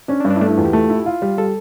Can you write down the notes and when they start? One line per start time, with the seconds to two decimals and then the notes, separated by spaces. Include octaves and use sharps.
0.08 C#4 D4
0.20 D4
0.25 G2
0.31 D4
0.36 E4
0.41 A3 D4
0.49 E4
0.57 E2 F4
0.65 G4
0.73 A3
0.90 E4
1.06 F4
1.22 G3
1.38 G3 A4